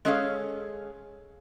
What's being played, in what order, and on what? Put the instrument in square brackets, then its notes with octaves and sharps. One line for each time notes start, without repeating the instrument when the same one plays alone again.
[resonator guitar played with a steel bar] G#3 C#4 G#4 A4 C#5 F5